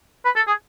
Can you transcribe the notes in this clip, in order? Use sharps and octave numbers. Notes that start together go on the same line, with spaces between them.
B4
A4
G#4